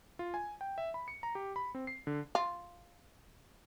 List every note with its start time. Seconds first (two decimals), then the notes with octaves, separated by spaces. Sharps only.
0.19 F4
0.34 G#5
0.61 G5
0.78 E5
0.94 B5
1.08 C#7
1.23 A#5
1.35 G4
1.56 B5
1.75 C4
1.87 C7
2.07 D3
2.35 F4